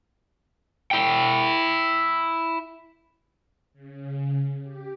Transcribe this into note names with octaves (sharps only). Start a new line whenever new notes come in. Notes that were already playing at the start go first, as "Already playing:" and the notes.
E4 G5
C#3
G4